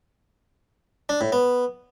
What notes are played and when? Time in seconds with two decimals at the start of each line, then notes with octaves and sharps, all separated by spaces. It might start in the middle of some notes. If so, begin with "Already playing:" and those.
1.09 D4
1.21 A2
1.32 B3